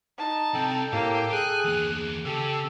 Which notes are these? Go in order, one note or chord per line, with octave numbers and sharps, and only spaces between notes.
D#4 A5
C2 C4 A4 G5
A2 A#3 G4
G#4 G#5 F#6
E2 A#3
C#3 G4 A4 E6